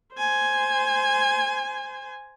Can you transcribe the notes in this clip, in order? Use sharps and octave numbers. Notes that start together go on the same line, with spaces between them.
C5 G#5